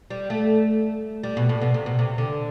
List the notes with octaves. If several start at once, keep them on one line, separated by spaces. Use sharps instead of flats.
G3
A3
G3
B2
A2
B2
C3
B2
C3
D3